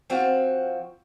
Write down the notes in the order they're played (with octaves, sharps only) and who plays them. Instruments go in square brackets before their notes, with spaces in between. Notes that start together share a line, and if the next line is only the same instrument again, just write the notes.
[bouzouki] F3 C4 F#4 F5